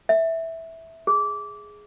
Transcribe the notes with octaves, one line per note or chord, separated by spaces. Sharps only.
E5
G#4